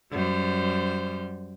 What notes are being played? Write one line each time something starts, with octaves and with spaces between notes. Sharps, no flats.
F#2 G3 C5